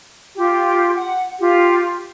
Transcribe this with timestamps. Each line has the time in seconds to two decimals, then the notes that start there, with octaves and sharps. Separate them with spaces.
0.36 F4 G4
0.96 F#5
1.39 F4 G4